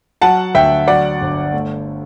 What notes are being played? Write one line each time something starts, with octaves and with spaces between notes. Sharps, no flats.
F#3 F#5 A5
D2 E5 G5
F#3 D5 F#5
G1
A3